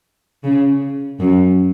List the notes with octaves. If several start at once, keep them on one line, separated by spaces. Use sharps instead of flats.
C#3
F#2